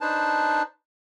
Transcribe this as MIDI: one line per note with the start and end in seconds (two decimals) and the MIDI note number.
0.01 0.62 62
0.01 0.62 63
0.01 0.62 71
0.01 0.62 72
0.01 0.62 81